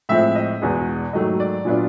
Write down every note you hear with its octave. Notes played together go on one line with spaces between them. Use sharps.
A2 F3 G#3 C4 E5
D#5
E2 B2 G#3 B3
G#2 D#3 F#3 A3 D#5
D5
A#2 F#3 B3 D4 F4